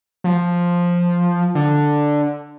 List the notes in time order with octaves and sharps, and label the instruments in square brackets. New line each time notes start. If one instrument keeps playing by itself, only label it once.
[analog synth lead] F3
D3